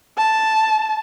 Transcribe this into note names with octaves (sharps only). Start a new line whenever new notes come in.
A5